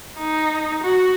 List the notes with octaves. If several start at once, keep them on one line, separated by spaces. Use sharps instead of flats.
D#4
F#4